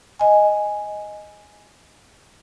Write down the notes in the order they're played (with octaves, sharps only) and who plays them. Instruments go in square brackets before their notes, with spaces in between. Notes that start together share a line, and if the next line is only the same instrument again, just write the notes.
[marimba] D#5 G#5